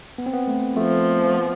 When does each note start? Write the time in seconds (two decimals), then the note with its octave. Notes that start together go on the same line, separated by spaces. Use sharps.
0.18 B3
0.26 C4
0.33 B3
0.48 A3
0.77 F3 A3
1.26 A3
1.34 B3